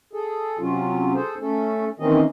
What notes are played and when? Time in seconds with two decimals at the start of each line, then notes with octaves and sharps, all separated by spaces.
0.13 G#4 A4
0.59 C3 F#3 C#4 F4
1.15 G#4 A4 C5
1.41 A3 C#4 A4
2.00 D#3 E3 A#3 C4 C#4 D#5